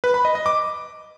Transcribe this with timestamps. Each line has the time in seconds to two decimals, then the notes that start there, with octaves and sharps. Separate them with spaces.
0.04 B4
0.14 B5
0.25 D#5
0.35 D#5
0.46 D6